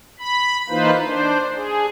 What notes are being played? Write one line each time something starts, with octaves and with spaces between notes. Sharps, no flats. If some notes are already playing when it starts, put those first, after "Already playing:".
B5
E3 A#3 D#4 F4 B4 C5
D4 C5
G#4